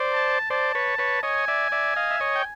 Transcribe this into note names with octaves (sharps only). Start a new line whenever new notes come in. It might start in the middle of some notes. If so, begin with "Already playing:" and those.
Already playing: C5 D5
A5
C5 D5 A5
B4 C#5
B4 C#5
C#5 D#5 G#5
D5 E5
D5 E5
D#5 F5
E5
C#5 D#5
G5